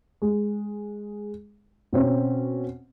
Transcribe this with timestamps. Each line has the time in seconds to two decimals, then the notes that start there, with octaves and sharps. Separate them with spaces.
0.22 G#3
1.93 B2 C4 C#4